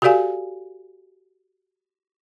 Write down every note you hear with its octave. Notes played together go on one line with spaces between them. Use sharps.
F#4 G4 A4 D5 F5 G#5